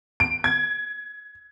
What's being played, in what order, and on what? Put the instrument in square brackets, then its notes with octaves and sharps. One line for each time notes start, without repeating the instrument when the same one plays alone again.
[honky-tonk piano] D7
G#6